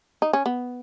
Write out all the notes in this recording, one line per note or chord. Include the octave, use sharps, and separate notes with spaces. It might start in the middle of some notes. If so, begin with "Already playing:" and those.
D#4
C#4
B3